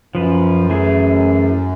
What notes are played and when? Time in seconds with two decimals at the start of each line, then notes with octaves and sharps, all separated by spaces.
0.15 F#2 F3 B4
0.70 E3 A3 G#4